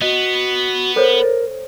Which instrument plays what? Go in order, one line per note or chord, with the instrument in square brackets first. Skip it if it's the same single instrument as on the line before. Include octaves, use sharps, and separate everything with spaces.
[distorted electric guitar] B3 [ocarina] F#4 [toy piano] D#5
[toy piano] A4 C5 C#5 [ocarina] A#4